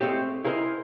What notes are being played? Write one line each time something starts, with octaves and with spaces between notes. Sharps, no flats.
G#3 A3 C4 G4
E4 G#4 A#4 C5 D#5